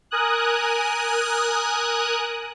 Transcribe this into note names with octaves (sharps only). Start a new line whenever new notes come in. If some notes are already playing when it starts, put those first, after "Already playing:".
A#4 G#5 D#6 F#6